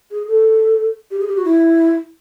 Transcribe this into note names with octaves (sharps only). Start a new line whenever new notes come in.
G#4
A4
G4
G#4
G4
F#4
E4